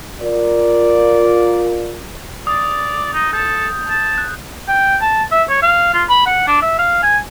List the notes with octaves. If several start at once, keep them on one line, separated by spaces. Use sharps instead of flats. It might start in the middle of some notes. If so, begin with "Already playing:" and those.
F4 A#4 D5
D5 D#6 A6
D#4
A4 G6
A5
F#6
G5
A5
E5
C#5
F5
F4
B5
F#5
D4
E5
F5
G#5